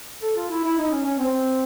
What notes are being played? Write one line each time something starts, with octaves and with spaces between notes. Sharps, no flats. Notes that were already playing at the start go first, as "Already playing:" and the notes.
A4
F4
E4
E4
D#4
C#4
C#4
C4